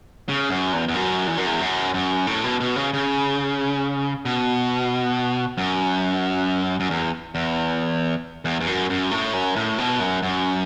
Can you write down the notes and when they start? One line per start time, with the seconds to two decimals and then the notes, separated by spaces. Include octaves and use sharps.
0.29 C#3
0.50 F#2
0.73 E2
0.88 E2
0.94 F#2
1.27 E2
1.37 F#2
1.46 E2
1.60 F#2
1.94 F#2
2.27 A2
2.44 B2
2.60 B2
2.76 C#3
2.94 C#3
4.25 B2
5.58 F#2
6.80 F#2
6.90 E2
7.35 E2
8.45 E2
8.60 E2
8.67 F#2
8.90 F#2
9.11 A2
9.33 F#2
9.56 A2
9.78 B2
10.00 F#2
10.22 F#2